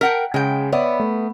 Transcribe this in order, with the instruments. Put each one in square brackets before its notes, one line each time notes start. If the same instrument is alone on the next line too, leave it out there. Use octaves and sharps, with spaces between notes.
[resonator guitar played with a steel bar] A#4 F#5 G5 [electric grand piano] B6
[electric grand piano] C#3 [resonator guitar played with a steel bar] G#3 G5
[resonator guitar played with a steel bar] B3 [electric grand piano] C#5 D5 E5
[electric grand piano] A3